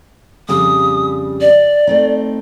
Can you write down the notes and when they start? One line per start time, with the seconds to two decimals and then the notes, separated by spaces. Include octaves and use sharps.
0.49 F2 C#3 G3 D#6
1.41 D5
1.87 A3 C4 D#4